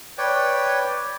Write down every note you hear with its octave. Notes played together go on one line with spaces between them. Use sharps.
B4 C#5 D5 G5